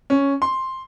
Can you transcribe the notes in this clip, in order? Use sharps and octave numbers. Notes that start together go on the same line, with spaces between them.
C#4
C6